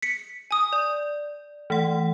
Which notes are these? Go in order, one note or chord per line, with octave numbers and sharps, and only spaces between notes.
B6 C#7
G#5 D#6
D5
E3 A3 F#5